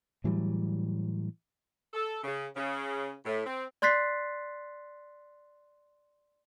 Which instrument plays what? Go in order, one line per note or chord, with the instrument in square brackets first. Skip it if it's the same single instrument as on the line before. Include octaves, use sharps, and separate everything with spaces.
[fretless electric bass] A2 E3 F#3 G3
[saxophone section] A4
C#3
C#3
A2
C4
[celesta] D5 C6 F#6 A6 B6 C7